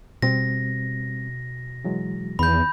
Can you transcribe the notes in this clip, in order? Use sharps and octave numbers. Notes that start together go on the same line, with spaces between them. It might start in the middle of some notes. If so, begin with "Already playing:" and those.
B2 G3 C4 A#6
E3 F#3 G#3
E2 D#3 B5 G6